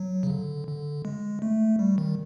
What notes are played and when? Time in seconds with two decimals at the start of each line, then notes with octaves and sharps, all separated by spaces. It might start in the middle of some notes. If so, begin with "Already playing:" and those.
Already playing: F#3
0.23 C#3
0.30 D3
0.68 D3
1.05 G#3
1.42 A3
1.79 G3
1.98 D#3